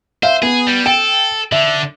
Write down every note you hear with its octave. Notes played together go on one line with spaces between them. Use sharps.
C5 E5 F5
B3 G#4
G3
A4 G5 D7
D3 E5